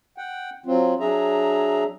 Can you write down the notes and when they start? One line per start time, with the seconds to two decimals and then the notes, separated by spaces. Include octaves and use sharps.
0.18 F#5 G5
0.66 F#3 C4 F4
1.00 F#3 D4 G#4 E5 A#5